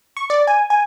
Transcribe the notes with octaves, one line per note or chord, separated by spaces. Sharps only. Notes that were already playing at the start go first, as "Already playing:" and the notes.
C#6
D5
G#5
G#5